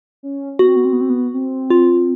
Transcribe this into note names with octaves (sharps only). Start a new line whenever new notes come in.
C#4
B3 F#4
C4
B3
C4
B3
C4
B3
C4
F4